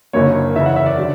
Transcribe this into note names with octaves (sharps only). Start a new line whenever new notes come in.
F#1 F#2 D3 A#3 C#5
F#1 E2 C#3 E5
F#5
E5
D5
D3 F#3